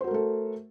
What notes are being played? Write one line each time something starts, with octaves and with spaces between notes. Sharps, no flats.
A3 F#4 A4 A#4 C5